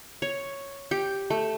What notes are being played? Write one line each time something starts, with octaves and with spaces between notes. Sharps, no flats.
C#5
G4
A3